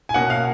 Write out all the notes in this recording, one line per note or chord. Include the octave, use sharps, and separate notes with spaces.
G#5
B2 A#3 C#4 F#5
F5